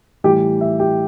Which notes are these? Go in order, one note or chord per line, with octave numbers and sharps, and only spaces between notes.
A2 E3 G3 G4 G5
E5
G4 G5